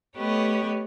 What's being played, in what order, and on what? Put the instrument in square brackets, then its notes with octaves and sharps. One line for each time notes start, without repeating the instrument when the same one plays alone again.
[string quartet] A3 B3 G4 B4 C#5 D#5